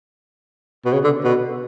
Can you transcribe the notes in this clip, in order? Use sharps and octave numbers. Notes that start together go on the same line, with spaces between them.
B2
C#3
D3
B2